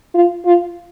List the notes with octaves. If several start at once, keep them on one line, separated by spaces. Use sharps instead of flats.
F4
F4